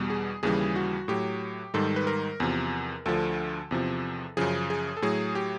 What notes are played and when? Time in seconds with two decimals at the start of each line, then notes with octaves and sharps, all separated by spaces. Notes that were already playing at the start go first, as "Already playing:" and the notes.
Already playing: E2 B2 G3
0.10 G#4
0.43 D#2 C#3 E3 G3 G#4
0.76 F#4
1.08 A2 F#3 G4
1.74 G#2 D#3 G3 A4
1.96 B4
2.07 A#4
2.40 E2 C3 F3
3.06 D2 D3 F3 A4
3.71 E2 C3 F3
4.37 F#2 C#3 F3 G#4
4.70 G#4
4.97 A4
5.02 A2 F#3 G#4
5.35 G4